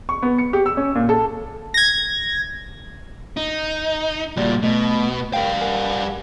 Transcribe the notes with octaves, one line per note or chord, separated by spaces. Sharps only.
C#6
B3
C#7
G4
E6
C#4
A#2
A4
G#6 A#6
D#4
C#2 A#2 G3 F#4 D5
B2 A3 D#5
G3 A#4 F5 G5
A#4 F#5 G#5